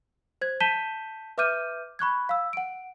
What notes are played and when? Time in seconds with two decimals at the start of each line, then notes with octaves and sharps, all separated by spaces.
0.41 C5 G#6
0.60 A5 G6 B6 D#7 E7 G7
1.38 B4 E5 D6 F6 G6 D#7
1.99 B5 C#6 F#6 G#6
2.29 F5 E6
2.53 F#5 D7